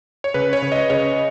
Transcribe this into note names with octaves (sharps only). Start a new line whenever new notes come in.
C#5
C#3 B4
C#5
C#3
D#5
C#3 C#5